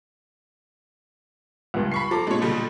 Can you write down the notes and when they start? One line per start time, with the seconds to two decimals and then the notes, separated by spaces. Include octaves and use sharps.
1.74 C#2 G2
1.92 B5 C#6 C7
2.11 F3 A4 A#5 D6
2.27 A#2 G#3 D4 C#5
2.42 B2 D3 G3